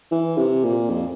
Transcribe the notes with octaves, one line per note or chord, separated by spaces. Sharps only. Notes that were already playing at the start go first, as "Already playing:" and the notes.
E3
C3
A#2
F2